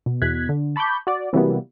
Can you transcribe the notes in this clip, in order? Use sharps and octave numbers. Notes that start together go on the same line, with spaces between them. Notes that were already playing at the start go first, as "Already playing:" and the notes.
B2
E2 B2 F#6 G#6 B6
D3
A5 B5 C#6 D6 G6
F#4 D5
C3 E3 F#3 G3 A#3 B3